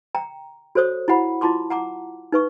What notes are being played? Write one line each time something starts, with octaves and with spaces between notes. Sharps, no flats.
G5 A#5
F#4 A4 C5 C#5 D#6
E4 F#4 F#5 B5
E4 F4 A5 C6 D6
F#5 A#5 D6
D#4 B4 C#6